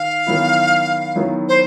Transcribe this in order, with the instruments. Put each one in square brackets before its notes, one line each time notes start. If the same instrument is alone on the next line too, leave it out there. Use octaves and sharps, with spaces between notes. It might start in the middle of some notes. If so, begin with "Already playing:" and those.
Already playing: [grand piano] D#3 [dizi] F5
[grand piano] D#3 F#3 B3 E4
D#3 F#3 B3 E4
[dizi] C5